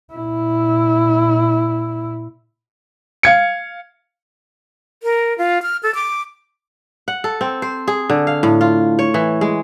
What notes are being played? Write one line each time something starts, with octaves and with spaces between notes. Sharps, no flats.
A#2 E4
F5 G#6 C#7
A#4
F4
F6
A4
D6
F#5
A4
C4
C5
G#4
D3
F5
A2
F4
C#5
E3
G#3